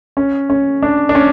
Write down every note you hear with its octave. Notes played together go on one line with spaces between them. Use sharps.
C#4
C#4
D4
D4
C#4